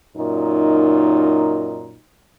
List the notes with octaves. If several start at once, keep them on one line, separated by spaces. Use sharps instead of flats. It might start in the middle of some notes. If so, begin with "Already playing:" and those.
F#2 A#2 D#4